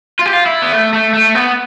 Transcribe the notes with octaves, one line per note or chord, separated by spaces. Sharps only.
F4
G4
F4
E4
B3
A3
A3
A3
B3